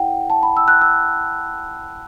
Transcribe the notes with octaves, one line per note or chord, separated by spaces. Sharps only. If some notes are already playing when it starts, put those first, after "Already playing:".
Already playing: E4 A4 C#5 F#5 G5
A5
B5
E6
F#6
E6